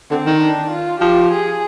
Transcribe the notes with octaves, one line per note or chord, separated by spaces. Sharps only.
D3 C4
D#3
D4
F4
F3 G4
G#4